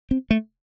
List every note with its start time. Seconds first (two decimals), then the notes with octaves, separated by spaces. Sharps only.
0.11 C4
0.31 A3